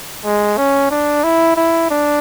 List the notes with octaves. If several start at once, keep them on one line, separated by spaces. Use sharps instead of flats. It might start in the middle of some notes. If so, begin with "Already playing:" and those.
G#3
C#4
D4
E4
E4
D4